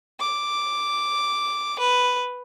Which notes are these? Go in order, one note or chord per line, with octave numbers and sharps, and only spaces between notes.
D6
B4